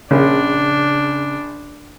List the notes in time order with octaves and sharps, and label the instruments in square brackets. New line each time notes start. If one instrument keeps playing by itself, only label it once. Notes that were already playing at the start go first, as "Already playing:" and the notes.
[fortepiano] A#1 [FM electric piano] C#3 [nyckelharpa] D4